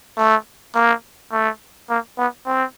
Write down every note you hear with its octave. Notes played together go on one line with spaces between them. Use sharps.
A3
A#3
A3
A#3
B3
C4